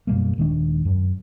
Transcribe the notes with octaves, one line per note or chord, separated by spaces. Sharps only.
F#2 B2 G3 A#3
D#1 D#3 G#3 D4
F#2